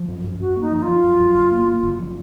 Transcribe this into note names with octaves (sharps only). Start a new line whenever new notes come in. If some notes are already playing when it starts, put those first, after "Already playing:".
Already playing: F3
F#2
F#2
F#2 F#4
A#3 D#4
F3 D#4
F4
F3
F#2
F#2
F#1
A#3
A#3
F#1
F3